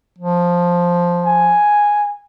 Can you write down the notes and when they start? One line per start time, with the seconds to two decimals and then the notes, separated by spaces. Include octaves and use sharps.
0.19 F3
1.26 G#5